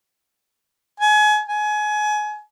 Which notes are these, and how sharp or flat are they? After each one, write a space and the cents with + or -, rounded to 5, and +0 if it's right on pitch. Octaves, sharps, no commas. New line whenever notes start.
G#5 +30
G#5 +25